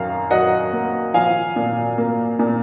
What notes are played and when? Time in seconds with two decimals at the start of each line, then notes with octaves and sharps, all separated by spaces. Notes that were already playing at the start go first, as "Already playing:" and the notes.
Already playing: F#2 D#3 F5
0.30 F#3 D#5 F#5
0.73 A#3
1.14 F3 F5 G#5
1.56 A#2
1.98 A#3
2.39 A#2